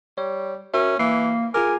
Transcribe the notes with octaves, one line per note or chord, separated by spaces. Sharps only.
G3 C#5
C#4 F#4 A#4 E5
E3 A#3 C7
F4 G#4 A#4 G#5 D6